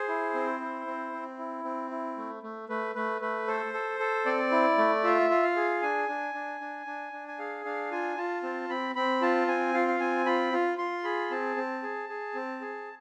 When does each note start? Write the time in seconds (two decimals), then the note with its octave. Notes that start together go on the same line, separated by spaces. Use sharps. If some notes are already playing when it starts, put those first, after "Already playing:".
Already playing: G#4 C5
0.08 E4
0.34 C4
0.60 E4
0.87 C4
1.12 C4
1.38 E4
1.64 C4
1.91 E4
2.17 A3
2.43 A3
2.69 A3 B4
2.95 A3 B4
3.21 A3 B4
3.47 A4 C5
3.74 A4
4.00 A4
4.26 C4 D5
4.52 E4
4.78 A3
5.04 F4 E5
5.30 F4
5.43 F5
5.56 G#4
5.82 D4 G#5
6.09 D4
6.34 D4
6.61 D4
6.87 D4
7.13 D4
7.28 G#5
7.39 G#4 F5
7.65 D4 F5
7.91 F4 G#5
8.17 F4 A5
8.43 C4 A5
8.69 C4 B5
8.95 C4 B5
9.22 F4 A5
9.48 C4 G#5
9.74 F4 F5
9.88 F5
10.00 C4 G#5
10.26 F4 B5
10.52 F4
10.78 F4 C6
11.04 G#4 B5
11.30 C4 A5
11.56 C4
11.83 G#4
12.09 G#4
12.35 C4
12.61 G#4